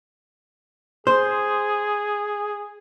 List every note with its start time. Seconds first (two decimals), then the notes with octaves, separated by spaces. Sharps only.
1.07 G#4 C5